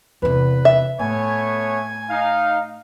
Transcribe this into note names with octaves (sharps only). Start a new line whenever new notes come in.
E2 C3 B4
E5
A2 A3 B3 C#5 G#5
D#4 F5